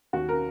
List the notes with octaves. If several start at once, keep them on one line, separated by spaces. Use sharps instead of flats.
D#2 F#4
A#4